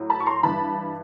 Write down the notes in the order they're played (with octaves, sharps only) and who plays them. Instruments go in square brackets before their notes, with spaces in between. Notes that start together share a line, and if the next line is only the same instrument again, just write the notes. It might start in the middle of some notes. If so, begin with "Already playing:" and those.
Already playing: [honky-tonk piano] A2 F#3
A5 B5
C#6
A#5 C6
G2 E3 A5 B5